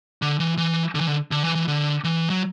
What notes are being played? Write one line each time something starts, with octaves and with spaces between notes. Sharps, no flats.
D3
E3
E3
D3
E3
D3
D3
E3
E3
D3
E3
F#3